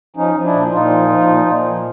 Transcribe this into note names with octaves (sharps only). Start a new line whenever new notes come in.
F3 C#4 D#4
F3
D4 E4
A#2
A#2 D#4 F4
F3
F3
A#2
A#2
F3